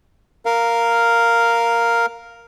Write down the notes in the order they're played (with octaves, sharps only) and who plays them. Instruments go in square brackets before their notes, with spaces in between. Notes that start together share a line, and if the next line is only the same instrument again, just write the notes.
[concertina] A#4 F5